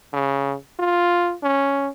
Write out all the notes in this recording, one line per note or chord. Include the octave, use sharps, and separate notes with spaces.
C#3
F4
C#4